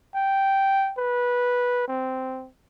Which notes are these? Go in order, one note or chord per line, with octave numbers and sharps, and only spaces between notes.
G5
B4
C4